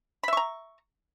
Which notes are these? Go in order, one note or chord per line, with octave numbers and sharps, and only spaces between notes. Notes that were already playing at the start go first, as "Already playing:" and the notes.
E5 A#5 B5 C#6